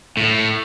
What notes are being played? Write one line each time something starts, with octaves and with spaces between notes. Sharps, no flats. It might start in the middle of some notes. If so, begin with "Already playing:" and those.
A2